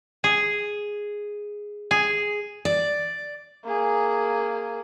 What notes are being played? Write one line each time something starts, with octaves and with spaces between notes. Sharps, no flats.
G#4
G#4
D5
A#3 G#4